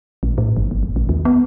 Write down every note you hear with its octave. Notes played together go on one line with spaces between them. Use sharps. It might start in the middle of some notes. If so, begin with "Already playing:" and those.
A#1
A2
G1
G#1
F1
A#1
D#2
B3